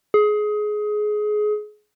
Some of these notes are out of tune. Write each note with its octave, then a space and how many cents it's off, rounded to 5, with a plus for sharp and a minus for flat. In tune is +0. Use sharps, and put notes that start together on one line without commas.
G#4 +20